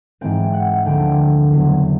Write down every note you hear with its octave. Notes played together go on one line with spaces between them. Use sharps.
G#2 E3 G#3 C4 G5
F#5
D2 D3 F3 A#3 G5
E2 C#3 F#3 B3